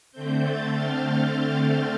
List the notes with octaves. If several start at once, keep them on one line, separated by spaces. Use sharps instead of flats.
D3 A3 C4 G6
A6
F6
G6
F6
G6